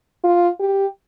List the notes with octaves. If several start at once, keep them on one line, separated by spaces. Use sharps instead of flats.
F4
G4